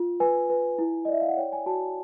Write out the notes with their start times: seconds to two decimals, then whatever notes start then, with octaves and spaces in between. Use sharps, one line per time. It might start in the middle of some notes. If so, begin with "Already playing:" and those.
Already playing: F4
0.20 B4 G#5
0.50 B4
0.79 E4
1.05 D#5
1.08 D5 E5
1.21 F5
1.29 F#5
1.37 C#5 G5
1.53 G#5
1.66 F#4 A5